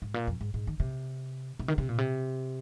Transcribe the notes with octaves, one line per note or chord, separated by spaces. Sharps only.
G#2
A#2
F2
G#2
G#2
D#3
C3
C3
D#3
C3
A#2
C3